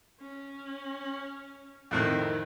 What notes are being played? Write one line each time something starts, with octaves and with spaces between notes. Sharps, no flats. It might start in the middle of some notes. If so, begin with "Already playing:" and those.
C#4
F2 A2 D#3 C4